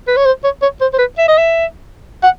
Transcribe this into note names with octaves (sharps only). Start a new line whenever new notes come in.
B4
C#5
C5
C#5
C#5
C5
C5
B4
E5
D#5
E5
F#5